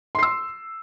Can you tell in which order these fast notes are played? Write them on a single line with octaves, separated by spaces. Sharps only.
C6 C7 E6